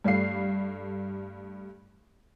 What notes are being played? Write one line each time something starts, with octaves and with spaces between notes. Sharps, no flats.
G2 G3 A3 F5 C7